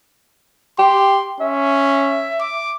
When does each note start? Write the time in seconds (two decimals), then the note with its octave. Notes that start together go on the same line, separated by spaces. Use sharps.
0.79 G4 C6
1.40 C#4 E5
2.40 D6